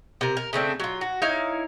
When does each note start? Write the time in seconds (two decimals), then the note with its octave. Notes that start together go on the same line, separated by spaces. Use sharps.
0.21 C3 A#4
0.37 A#4
0.53 C#3 A3 C4 D4
0.80 F#3 F4
1.01 F#4
1.22 D#4 E4 C#5 F5